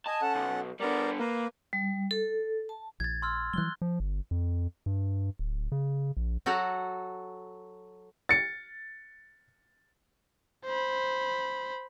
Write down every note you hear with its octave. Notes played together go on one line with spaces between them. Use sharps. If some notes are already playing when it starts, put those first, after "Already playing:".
D#5 G#5 A5
C#4 A4 F#5
B1
D3 G3 B3 A#4 D5
A#3 A#4 B4
G3
A4
A5
A#1 G#6 A6
C6 E6 F6
E3 F#3 G3 F#6 G7
F3
G1
F2
G2
D1
C#3
A#1
F#3 F#4 A4 F#5 A#5
A6 C#7
C5 B5